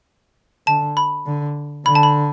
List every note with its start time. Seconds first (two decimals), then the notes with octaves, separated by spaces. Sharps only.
0.67 D3 A5
0.97 B5
1.26 D3
1.86 D3 B5
1.95 A5
2.03 B5